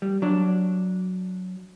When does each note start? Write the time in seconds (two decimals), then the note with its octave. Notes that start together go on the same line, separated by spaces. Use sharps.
0.02 G3
0.22 F#3 D4